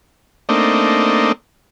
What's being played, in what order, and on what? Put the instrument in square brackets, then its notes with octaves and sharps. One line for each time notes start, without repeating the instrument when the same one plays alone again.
[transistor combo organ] A3 A#3 C4 D4 D#4